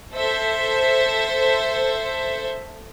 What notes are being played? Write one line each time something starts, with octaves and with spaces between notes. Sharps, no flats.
A4 C5 E5